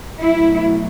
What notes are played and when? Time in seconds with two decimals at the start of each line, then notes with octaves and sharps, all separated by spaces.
0.22 B2 F#3 A3 E4